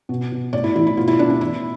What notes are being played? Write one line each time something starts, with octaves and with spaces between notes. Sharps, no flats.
B2
B2
A2 D5
E4
E3 E4
E4
B2 F4
E4
B2 D4
D4
E3 E4